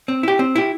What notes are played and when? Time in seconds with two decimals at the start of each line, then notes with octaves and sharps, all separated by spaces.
0.08 C4
0.23 E4 G4
0.39 C4
0.56 E4 G4